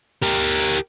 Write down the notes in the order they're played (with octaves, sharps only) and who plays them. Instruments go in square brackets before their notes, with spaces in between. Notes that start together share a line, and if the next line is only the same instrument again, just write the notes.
[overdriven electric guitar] G4 A#4